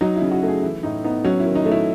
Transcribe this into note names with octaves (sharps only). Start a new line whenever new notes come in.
F#3 D#4
E4
C#3
F#4
A3 G#4
E3 E4
A2 D#4
B3 D#4
F#3 C#4
E4
D#3
D#4
A3
E4